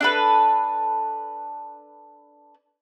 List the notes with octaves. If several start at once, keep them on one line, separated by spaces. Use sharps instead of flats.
D4 A4 B4